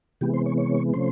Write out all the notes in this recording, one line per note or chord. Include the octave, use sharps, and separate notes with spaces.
C3 E3 G#3 B3 G4
C5
C#5
C#5
C3 F3 A3 C#4 C5